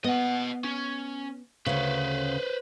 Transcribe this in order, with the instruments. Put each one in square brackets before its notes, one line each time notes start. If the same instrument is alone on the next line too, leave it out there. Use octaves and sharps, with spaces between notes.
[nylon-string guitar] B3 [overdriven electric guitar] D#5 F#5
[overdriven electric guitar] C#4
[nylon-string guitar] D2 C#3 [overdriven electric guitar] B4 C5